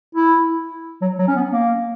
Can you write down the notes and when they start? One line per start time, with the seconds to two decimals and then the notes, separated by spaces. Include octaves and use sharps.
0.15 E4
1.01 F#3
1.19 F#3
1.28 C#4
1.36 B3
1.53 A#3